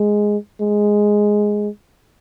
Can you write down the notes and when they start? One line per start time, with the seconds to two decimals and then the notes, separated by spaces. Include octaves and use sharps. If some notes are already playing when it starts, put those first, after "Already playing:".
Already playing: G#3
0.61 G#3